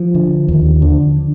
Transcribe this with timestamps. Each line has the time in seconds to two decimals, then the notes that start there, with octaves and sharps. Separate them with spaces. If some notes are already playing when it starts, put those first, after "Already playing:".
Already playing: F3
0.15 D3
0.48 D#2
0.82 D3